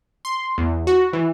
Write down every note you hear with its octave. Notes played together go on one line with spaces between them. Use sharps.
C6
E2
F#4
E3